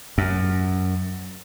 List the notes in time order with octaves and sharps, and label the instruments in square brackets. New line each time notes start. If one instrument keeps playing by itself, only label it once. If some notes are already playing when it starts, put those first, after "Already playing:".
[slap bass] F#2